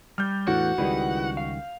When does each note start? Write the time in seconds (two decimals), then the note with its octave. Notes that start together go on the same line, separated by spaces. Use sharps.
0.18 G3 F6 G6
0.48 E2 A2 E3 D4 F#4 F#5
0.78 C#2 D#3 G3 E4 G#4 B4
1.37 F5